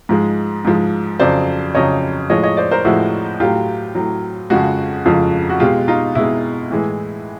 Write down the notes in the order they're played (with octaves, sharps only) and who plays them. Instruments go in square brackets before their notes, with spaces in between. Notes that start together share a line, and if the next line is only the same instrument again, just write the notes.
[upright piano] G#2 F3 G#3
G#2 F3 G#3
F2 C#3 F#3 C5 D5
F2 C#3 F#3 C#5 D#5
A2 F3 G#3 C#5 D#5
C#5 D#5
C5 D5
A#4 C5
A2 F3 G#3 E4 F#4
A2 F#3 F4 G4
A2 F#3
F2 C#3 F3 G#3 F#4 G#4
F2 C#3 F3 G#3
F#4
B2 G#3 F4 G4
D#4 F4
B2 G#3 E4
A2 E3 G#3